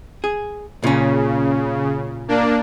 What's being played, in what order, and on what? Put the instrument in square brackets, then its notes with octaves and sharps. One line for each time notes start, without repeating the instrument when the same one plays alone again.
[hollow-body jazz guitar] G#4
[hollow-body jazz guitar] A#2 C#4 [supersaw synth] C#3
[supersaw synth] A#3 D4